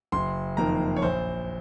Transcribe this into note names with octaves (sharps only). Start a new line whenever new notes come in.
F#1 C6
F2 D#3 A#3 A#5
C#5
A#1 C5